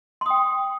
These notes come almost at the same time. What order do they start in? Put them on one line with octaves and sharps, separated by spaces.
C6 D#6 G5